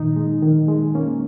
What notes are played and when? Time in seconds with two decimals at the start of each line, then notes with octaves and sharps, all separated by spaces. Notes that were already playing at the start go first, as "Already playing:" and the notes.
Already playing: A#2 D#3 D#4
0.16 G#3
0.43 D#3
0.68 G#3
0.95 A#3 C#4